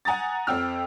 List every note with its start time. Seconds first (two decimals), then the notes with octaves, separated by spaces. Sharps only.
0.05 F#5 G#5 A#5 D#6 A6
0.47 F2 C4 G5 E6 F6